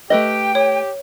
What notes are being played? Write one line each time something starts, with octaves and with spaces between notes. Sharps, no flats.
A3 G4 B4 D#5 G5
G4 C#5